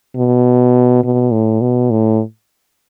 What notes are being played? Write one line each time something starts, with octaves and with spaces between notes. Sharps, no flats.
B2
B2
A2
B2
A2